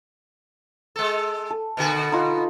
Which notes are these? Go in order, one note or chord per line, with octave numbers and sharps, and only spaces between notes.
G#3 A4
A4
B2 D3 F#4
D#4 F4 F#5